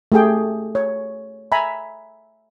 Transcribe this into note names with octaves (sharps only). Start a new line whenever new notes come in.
A3 G4 G#4 G5
C#5
E5 G#5 A#5 B5